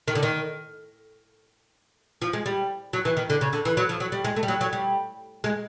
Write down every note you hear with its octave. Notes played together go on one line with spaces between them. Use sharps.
D#3
D3
D#3
F3
G#3
G3
F#3
E3
D#3
D3
C#3
D3
E3
F#3
F3
F#3
G3
G#3
A3
G3
F#3
F#3
G3
G#3